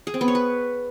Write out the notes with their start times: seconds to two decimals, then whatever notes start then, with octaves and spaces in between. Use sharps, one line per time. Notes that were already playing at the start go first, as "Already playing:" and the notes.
0.07 G#4
0.14 C4
0.21 B3
0.28 C#5
0.35 B4